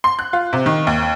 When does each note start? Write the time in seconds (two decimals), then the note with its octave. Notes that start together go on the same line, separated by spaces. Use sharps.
0.04 C6
0.19 F#6
0.33 F4
0.53 C3
0.66 D#3
0.87 D#2